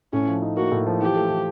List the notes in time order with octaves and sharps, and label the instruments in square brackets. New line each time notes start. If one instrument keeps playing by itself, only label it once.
[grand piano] A2 [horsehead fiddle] C#4
[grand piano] F3
D#4
[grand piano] A#3 [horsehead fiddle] F#4
[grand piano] A2
F3
[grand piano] E3 [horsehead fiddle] G4
[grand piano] A3
E3